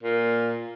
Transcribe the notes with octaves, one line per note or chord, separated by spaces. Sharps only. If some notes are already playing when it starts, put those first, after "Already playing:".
A#2